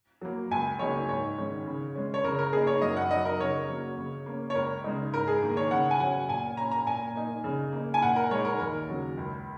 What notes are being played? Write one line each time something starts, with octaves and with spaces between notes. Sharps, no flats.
F#3 A#3
C#2 G#5
C#3 F#3 A#3 D#4 C#5
G#2 C#5
D#3 G#3 C#4
C#3
G#3 C#4
C#5
C#3 A#4
A#4
A#3 D#4 G#4
C#5
F#2 D#5
F#5
F#3 D#4 D#5
A#4
C#3 C#5
F#3 A#3 C#4
C#3
A#3 C#4
C#5
C#2 A#4
C#3 G#3 D#4
G#2 A#4
G#4
D#3 A#3
C#5
C#3 F#5
G#5
F#3 C#4 F#5
A#2 G#5
A#3 C#4 A#5
A#5
A#2 G#5
A#3 D#4
C#3
A#3 D#4
G#5
A#2 F#5
A#4
G#3 D#4 C#5
A#4
D#2 A#4
C#3 F#3 C#4
C#2